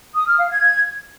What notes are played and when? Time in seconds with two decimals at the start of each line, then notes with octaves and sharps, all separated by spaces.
0.14 D#6
0.26 F6
0.38 F5
0.50 G#6